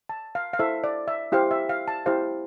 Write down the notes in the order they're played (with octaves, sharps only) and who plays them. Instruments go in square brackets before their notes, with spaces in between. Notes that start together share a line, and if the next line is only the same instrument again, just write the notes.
[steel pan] A5
F5
F5
E4 A4 C5 E5
D5
E5
E4 G4 C5 F5
E5
F5
A5
E4 G4 C5 F5